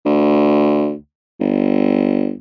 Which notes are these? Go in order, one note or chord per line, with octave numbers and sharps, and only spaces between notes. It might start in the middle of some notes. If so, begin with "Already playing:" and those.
D2
G1